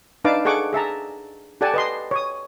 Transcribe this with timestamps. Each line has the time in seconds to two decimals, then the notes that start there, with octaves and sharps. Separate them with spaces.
0.24 D4 D#4 B4 F5 A5 D6
0.45 G#4 A4 F#5 C#6 D6
0.73 G#4 E5 A5 A#5
1.61 G4 A4 D5 F#5 G#5 A5
1.74 B4 D#5 C6
2.11 C#5 D#6